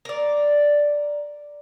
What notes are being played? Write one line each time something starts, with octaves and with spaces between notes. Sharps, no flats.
A#4 D5